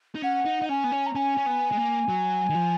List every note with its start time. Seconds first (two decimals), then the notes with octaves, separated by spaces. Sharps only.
0.15 D#4
0.22 C#4 F#5
0.45 D#4
0.61 D#4
0.69 C#4 G#5
0.84 B3
0.92 C#4
1.06 A#5
1.15 C#4 G#5
1.37 C#4
1.46 B3
1.72 G#3
1.77 A#3
2.09 F#3
2.50 D#3
2.55 F3